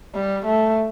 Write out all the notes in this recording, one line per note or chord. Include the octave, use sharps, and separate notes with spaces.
G3
A3